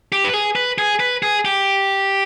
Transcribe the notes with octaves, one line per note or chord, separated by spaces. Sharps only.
G4
B4
G#4
B4
G#4
B4
G#4
G4